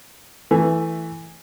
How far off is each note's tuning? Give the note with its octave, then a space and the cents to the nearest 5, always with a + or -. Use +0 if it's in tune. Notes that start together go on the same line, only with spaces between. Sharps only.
E3 +0 A3 +10